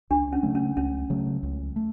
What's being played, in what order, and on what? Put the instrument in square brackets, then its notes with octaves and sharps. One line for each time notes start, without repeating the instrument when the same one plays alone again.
[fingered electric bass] C#2 [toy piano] D4
[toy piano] C#4
[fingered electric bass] C#3 F#3 A3
[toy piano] C#4
[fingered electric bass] C#2 [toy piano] C#4
[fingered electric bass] C#3 F#3 A3
C#2
A3